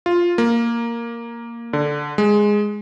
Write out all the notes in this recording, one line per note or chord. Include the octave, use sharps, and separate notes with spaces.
F4
A#3
D3
G#3